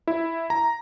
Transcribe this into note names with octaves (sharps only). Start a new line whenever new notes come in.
E4
A#5